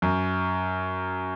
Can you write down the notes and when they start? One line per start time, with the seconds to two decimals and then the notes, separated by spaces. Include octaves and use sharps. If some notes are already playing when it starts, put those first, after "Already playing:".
0.02 F#2